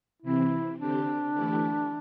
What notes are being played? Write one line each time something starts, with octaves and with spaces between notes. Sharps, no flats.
C3 E3 C4 E4
D3 C4 D4 G4
E3 A3 E4 G4